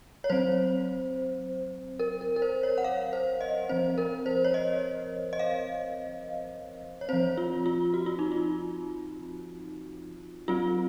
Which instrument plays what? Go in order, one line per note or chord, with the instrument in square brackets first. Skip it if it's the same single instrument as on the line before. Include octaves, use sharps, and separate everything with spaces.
[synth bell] C#5
F#3 C4 C5
A#4
A#4
A#4
C5
C#5
F#5
F5
C5
D#5
F3 C4 C5
A#4
C5
C#5
D#5
D#5
F5
C#5
F3 C4 C5
F4
F4
F#4
F4
D#4
F4
F#3 C4 F4